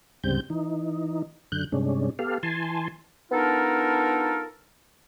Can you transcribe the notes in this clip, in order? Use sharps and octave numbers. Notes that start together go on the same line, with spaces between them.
D2 G#2 C#3 G3 C4 G6
E3 D#4
F#2 D3 F#6 G6
G2 C3 G#3 C#4 D4
B3 G4 A4 F5
E3 G#5 A5 C6
B3 D4 D#4 F4 A4 A#4